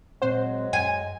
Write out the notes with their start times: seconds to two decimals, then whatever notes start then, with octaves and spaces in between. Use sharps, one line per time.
0.22 A#2 F#3 G#3 C4 C5 F#5
0.73 F#2 G#5